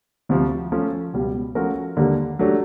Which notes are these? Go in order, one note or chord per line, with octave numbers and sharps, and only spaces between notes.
D2 C3 F3
F3 A3 C#4
C#2 B2 G3
F3 A3 C#4 F#4 A#4
D#2 D3 G3 A#3
F#3 A3 D4 G4